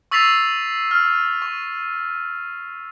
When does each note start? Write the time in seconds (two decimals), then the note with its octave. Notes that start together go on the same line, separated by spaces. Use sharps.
0.11 C#6 E6 A6 B6 C7 F7
0.91 F6
1.42 C#6